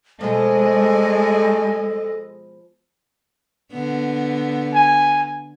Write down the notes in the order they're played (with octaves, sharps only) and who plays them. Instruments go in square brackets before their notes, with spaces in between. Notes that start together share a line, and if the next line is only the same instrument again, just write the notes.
[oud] B2 F3 [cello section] G#3 D#5 [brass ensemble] A3 D5 G#5 [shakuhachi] A4
[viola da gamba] D3 B3
[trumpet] G#5